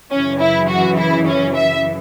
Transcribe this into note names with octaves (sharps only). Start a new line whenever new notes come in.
F#2 C#3 E3 C#4
E4
F#4
E4
C#4
E5